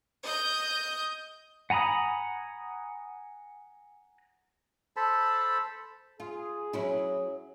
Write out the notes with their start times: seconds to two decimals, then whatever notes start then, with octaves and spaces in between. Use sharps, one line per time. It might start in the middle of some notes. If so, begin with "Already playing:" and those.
0.23 D#5 G6
1.70 F#5 G#5 A#5 B5 D#6
4.96 A4 C5 A5 B5
6.20 F4 G#4
6.73 F#3 C#4 E4